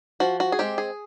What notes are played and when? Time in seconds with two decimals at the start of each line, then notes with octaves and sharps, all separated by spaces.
0.20 F3 F#4
0.40 F#4
0.52 G#4
0.59 G#3 C4 G4
0.78 G#4